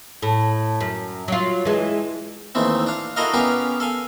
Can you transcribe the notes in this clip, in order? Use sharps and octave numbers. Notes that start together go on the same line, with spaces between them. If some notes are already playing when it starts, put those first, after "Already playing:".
A2
F#2
F#3 F4
E3 G#3
D#2 D#3 E3 A3 C4
D4 F5
E4 F#4 A4 A#4 D#5 F5
B3 C#4 G4 G#4 A#4 F5
A4 F5 G#5